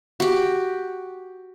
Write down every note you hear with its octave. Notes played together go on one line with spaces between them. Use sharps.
F#4 G4